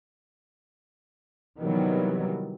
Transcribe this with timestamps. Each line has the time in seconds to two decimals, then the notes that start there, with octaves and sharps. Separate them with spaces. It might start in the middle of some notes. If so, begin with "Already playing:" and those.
1.58 C3 D#3 E3 F#3 G3 B3